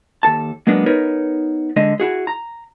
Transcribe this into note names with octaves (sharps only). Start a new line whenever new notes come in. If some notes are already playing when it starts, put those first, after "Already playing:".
D#2 A4 A5
F#3 G#3 A#3 B3 D4
B3 D#4 A#4 B4 C#5
D3 G#3 D#5
E4 F#4 G#4
A#5